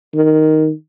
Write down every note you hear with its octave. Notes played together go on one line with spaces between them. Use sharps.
D#3